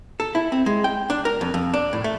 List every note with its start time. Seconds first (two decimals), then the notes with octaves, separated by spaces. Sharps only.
0.20 A4
0.35 E4
0.52 C4
0.66 G#3
0.84 G5
1.10 D4
1.25 A#4
1.41 F2
1.54 F2
1.73 D4
1.93 A2
2.04 A3